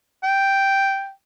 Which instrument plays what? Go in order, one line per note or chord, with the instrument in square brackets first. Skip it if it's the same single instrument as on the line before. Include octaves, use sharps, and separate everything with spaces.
[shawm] G5